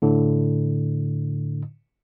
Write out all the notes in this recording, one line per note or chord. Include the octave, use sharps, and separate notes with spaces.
A2 D3